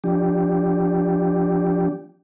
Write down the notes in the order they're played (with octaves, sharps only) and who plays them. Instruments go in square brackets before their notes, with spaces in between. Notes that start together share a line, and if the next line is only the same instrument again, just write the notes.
[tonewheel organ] F3 D4 G4